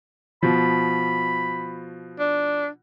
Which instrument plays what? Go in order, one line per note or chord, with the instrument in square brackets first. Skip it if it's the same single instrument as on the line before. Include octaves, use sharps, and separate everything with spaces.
[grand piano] B2 F3 [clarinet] B5
[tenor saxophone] D4